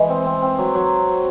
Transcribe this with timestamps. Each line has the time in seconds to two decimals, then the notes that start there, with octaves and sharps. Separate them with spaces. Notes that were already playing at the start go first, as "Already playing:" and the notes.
Already playing: E3 G#3
0.09 C4
0.26 C4
0.42 C4
0.59 F#3
0.75 F#3